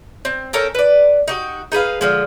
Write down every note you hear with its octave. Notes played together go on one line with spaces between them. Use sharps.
C4
C#4 A4 A#4 G5
B4 D5
D#4 F#4 G4
D#4 G#4 B4 F5
D3 F3 G#3